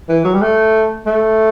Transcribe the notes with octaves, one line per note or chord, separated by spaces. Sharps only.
E3
F#3
G3
A3
A3